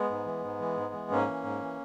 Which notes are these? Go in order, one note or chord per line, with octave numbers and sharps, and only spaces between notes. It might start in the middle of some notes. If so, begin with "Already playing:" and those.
Already playing: G#3 B3
G#2
E3
G#2
E3
G#2
E3
G#2 A#3 C#4
E3
G#2
E3